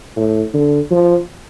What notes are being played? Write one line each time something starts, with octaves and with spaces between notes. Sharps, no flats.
A2
D3
F3